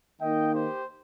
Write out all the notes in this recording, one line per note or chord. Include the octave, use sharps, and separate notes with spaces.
D#3 A#3 D#4 D#5 G5
G4 C5